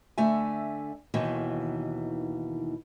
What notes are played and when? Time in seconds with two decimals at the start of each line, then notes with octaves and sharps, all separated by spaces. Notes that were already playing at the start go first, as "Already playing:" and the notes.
0.18 D3 A3 E5 G#5
1.14 D#2 B2 D#3 E3